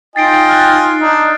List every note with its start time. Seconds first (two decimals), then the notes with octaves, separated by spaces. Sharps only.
0.16 D#4 F4 D#5 G5 G#5 A6 C7 D7
0.49 F6 F#6 A6
1.01 D4 D#4